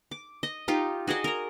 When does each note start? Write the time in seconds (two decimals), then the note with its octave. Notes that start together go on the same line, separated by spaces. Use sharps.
0.11 D6
0.43 D#5
0.68 D#4 F4 G4
1.07 F#4 G#4 D5 D#5
1.24 A#4 A#5